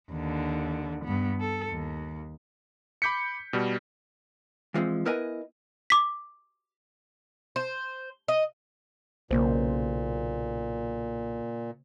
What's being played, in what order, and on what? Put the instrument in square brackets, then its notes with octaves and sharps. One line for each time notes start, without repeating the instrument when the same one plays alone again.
[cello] D#2 D3
G2 B3
A4
D#2
[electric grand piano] B5 D6 G6 B6 C#7
B2 G3
[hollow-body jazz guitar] E3 F3 G#3 C4
B3 E4 A#4 B4 D#5 G#5
[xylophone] D6 B6
[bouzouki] C5
D#5
[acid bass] B1 [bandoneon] A#2 [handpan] C#3 A#3 C5